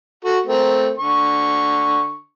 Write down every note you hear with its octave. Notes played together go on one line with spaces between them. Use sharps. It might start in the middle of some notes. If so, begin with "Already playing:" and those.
F#4 A4
A3 C4 A#4
D3 C#6